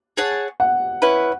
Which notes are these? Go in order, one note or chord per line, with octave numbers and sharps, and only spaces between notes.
G#4 C#5 F#5 A5
F#5
C#4 E4 B4